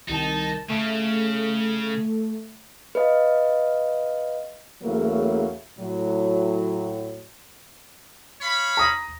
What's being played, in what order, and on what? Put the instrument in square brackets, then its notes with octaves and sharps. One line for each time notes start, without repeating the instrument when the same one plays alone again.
[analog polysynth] C2 D#3 A5 [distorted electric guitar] D#4
[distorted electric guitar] C#3 [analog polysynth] A3
[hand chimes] B4 D#5 F5
[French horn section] E2 C#3 F#3 A3 A#3 E4
A2 F#3
[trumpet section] C#5 F5 B5
[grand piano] A#5 D#6 A#6